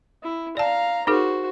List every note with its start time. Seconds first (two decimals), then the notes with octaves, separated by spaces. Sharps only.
0.23 E4
0.57 D5 F5 A5 A#5
1.07 D#4 F#4 G#4 A#4 C5